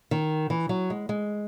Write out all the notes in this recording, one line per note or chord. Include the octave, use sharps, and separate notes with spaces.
D#3
E3
F#3
G#3
G#3